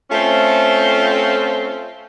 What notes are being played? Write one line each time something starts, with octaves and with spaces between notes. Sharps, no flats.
A3 C4 C#4 F4